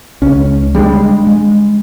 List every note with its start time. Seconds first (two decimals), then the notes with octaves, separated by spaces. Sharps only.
0.22 C#2 C#4
0.75 G3 G#3 C#4 D4
1.27 G#3